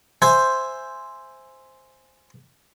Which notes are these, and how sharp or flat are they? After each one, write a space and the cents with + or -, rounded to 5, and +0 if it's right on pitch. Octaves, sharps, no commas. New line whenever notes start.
C5 +0 E5 +5 G#5 +0